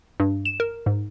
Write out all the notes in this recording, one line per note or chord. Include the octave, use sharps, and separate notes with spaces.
G2
E7
A#4
G#2